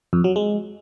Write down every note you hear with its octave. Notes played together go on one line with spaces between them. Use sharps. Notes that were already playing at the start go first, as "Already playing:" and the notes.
F2
F#3
G#3